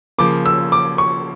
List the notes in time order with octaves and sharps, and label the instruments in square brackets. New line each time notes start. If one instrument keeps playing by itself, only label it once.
[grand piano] C#3 F3 A#3 [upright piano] D6
[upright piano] E6
D6
C#6